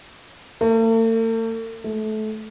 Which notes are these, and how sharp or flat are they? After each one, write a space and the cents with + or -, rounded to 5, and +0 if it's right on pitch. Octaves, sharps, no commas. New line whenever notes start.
A3 +45
A3 -25